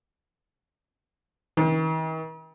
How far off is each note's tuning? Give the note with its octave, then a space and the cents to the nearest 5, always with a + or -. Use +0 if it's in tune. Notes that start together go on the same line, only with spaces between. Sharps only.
D#3 +45